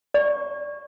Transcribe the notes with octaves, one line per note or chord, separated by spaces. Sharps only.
D5 C#6